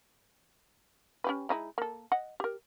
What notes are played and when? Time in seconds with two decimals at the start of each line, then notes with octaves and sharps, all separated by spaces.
1.24 C#4 G4 B4
1.49 G#3 D#4 E4
1.78 A#3 A4
2.12 D#5 F#5
2.40 G4 A#4